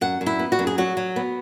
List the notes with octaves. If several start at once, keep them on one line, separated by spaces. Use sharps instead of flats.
F#2 F#5
F#2
E4
B3
F#4
F#2
G#4
F#3 F#4
F#3
B3